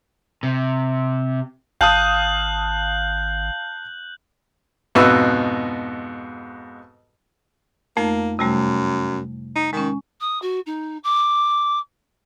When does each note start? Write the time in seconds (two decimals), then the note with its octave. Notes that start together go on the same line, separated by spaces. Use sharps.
0.43 C3
1.81 G#1 F5 A5 D#6 F#6 G6 F#7
4.95 F2 G#2 B2 F#4 B4 E6
7.97 F2 A3 A#3 D#4
8.39 F#2 C3 G3 A3
9.56 D#4
9.73 D#3 G#3 C#4
10.20 D#6
10.42 F#4
10.66 D#4
11.03 D6